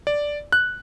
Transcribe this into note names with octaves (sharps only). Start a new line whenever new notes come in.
D5
F#6